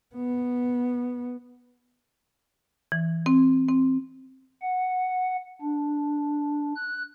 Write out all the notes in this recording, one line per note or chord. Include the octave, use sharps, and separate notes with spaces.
B3
E3
C4
C4
F#5
D4
F#6